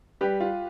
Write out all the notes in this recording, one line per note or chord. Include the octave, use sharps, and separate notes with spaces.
G3 G4 B4
F4